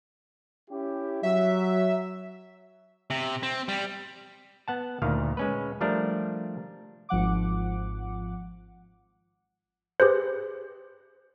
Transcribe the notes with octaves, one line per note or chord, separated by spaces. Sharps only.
C#4 E4 G4
F#3 E5
C3
C4
G3
B3 F#5 A5
D2 A#2 D#3 F5
G#3 C#4 B4
F3 G3 A3 D4 A#4
G#1 F3 F#5 D6
G4 G#4 B4 C5